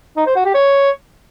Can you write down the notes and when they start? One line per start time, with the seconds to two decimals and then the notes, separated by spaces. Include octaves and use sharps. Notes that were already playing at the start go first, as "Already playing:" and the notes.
0.17 D#4
0.26 C5
0.36 F#4
0.45 G4
0.54 C#5